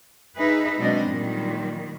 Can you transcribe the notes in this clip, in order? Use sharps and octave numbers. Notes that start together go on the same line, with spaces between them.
D#4 G#4 B4 E5
B2 F#3 G#3 C4 D4 D#5
A#2 D#3 F#3 G3